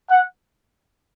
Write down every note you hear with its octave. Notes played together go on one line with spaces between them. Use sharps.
F#5